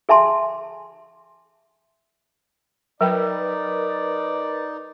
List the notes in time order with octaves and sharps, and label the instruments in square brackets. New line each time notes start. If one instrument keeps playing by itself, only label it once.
[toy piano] G#4 E5 G#5 A5 C6
[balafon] F#3 G5 [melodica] D#4 [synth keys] A#4 B4 [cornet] D5